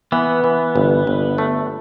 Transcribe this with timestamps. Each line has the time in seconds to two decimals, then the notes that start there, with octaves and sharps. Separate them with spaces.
0.12 E3 B3
0.44 E3
0.76 G1
1.07 G1
1.38 A3